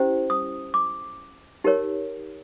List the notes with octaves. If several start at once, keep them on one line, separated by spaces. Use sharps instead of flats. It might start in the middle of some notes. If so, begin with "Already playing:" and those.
Already playing: C#4 E4 G4 C5
D#6
D6
D#4 G4 A#4 C#5